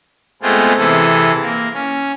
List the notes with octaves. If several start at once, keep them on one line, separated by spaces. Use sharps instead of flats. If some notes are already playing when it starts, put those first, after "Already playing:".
G#3 A3 B3 C4 F4 G#4
C3 E3 G#4 A4
A#3
C#4